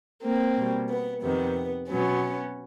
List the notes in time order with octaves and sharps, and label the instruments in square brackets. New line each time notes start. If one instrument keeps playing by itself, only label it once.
[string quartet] A#3 C4
B2 G3
B3
F2 C3 D#3 B3
B2 F#3 B3 C#4